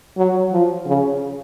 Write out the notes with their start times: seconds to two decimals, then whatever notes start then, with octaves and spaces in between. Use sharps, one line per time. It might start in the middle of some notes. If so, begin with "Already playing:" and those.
0.17 F#3
0.52 F3
0.86 C#3